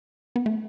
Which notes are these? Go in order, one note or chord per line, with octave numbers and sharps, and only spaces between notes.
B3
A3